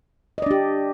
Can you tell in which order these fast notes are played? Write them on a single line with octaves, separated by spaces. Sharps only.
D#5 D5 D4 G4